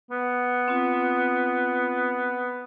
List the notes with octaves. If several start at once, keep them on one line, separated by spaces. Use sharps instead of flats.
B3
C4 F4